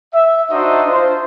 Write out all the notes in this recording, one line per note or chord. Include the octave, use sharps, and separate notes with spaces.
E5
D4 D#4 F#4 C5 D#5 E5
F4 C5